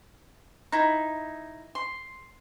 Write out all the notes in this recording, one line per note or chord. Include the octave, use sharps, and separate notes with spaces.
D#4 E4
C6